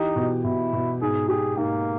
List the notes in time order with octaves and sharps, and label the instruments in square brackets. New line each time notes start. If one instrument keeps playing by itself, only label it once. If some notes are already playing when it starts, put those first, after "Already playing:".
Already playing: [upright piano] E3 G4 [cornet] D#4
[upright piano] B2
[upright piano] B2 [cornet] E4
[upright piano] B2
[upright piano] G#2 [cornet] G#4
[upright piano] G4 [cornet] G#4
[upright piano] G#2 [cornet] A#3